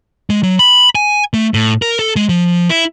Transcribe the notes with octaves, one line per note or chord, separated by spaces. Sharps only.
G#3
F#3
B5
G#5
A3
A2
A#4
A4
G#3
F3
E4